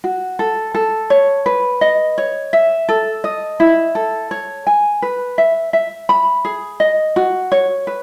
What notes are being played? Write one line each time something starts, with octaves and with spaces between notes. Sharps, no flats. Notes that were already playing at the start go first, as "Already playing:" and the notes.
F#4
A4
A4
C#5
B4
D#5
C#5
E5
A4
D#5
E4
A4
C#5
G#5
B4
E5
E5
B5
G#4
D#5
F#4
C#5
B4